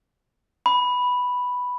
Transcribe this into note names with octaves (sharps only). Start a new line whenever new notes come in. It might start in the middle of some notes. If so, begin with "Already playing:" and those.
B5